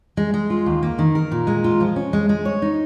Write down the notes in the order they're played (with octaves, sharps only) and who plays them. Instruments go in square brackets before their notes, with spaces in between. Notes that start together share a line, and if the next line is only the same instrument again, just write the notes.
[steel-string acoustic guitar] G#3
G#3
F4
D#2
A#3
D#3
A#4
A#2
G#3
F4
F3
C#4
G#3
G#3
C#5
D#4